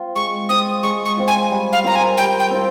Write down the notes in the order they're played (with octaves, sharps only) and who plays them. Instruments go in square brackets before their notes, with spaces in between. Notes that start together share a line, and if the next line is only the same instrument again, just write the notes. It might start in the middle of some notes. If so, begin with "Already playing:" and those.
Already playing: [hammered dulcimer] C4 F4
[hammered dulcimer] G#3 [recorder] C#6
[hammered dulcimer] C4 F4 [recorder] D#6
[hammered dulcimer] G#3 [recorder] C#6
[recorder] C#6
[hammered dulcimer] C4 F4
[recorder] G#5
[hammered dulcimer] G3
[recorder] F5
[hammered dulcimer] C4 F4 A#4 [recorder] A#5
[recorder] G#5
[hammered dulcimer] G3 [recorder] G5
[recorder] G5
[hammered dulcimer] C4 F4 A#4